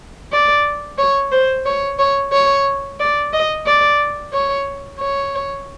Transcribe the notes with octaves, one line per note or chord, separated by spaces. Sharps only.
D5
C#5
C5
C#5
C#5
C#5
D5
D#5
D5
C#5
C#5